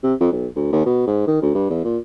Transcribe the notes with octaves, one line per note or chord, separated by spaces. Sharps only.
C3
F2
B1
D2
D#2
B2
G#2
D#3
D2
G2
E2
A#2